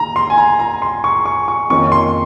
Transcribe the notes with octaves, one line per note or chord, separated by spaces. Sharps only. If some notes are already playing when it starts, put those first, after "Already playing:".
Already playing: D#3 A#3 A#5
C6
G#5
A#5
A#5
C6
C#6
C#6
C#6
F2 D#3 A#3 C#4 C#6
C6